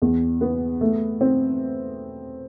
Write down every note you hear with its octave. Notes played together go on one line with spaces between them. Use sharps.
E2
B3
A3
C4